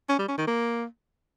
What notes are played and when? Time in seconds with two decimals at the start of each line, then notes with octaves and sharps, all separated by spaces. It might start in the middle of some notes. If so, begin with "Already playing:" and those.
0.09 C#4
0.19 G3
0.28 C#4
0.38 D#3
0.47 A#3